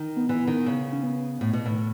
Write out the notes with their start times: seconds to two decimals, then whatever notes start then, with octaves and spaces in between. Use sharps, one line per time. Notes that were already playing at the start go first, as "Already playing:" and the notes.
Already playing: D#3
0.16 B3
0.29 E3
0.47 D#3
0.66 C#3
0.92 C#4
1.03 B3
1.41 A2
1.53 B2
1.66 A2 D#3